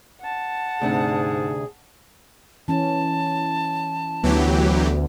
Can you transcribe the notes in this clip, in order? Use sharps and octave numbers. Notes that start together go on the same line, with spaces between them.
F#5 A5
D2 G#2 C3 D4 G#4
E3 C#4 A5
D2 E3 F#3 B3 G4